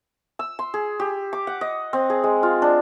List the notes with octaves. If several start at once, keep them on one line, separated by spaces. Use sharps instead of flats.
E6
C6
G#4
G4
D6
F#5
D#5
C4
G#4
G#3
F4
D4